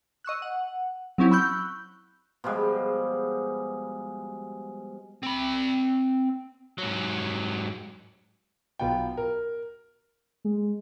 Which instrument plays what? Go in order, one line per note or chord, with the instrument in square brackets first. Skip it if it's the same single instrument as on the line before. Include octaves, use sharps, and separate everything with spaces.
[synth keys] D#5 C#6 E6 F#6
F#5
F#3 C4 C#4 E4 G4
B5 C#6 E6 F#6 G6
[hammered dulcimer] B2 F3 G3 G#3
[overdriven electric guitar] C4 B5
G#2 F#3
[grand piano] B1 B3 F4 G5
A#4
[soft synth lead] G#3